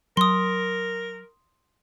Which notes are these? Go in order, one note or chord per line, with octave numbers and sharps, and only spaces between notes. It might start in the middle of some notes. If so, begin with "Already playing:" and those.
F#3 A#4 C6 D#6